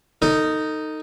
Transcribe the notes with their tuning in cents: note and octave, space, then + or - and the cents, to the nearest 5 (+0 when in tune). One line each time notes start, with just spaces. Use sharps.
D#4 +0 A4 +35